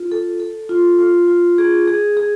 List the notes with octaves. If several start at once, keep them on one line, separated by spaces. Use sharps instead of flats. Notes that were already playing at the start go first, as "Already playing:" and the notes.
Already playing: F4
A4
A4
F4
F4
F4
G#4
G#4
G#4